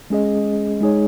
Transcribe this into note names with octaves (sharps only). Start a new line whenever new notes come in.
G#3 C#4 G#4 D#5
G#3 D#4 G#4 C#5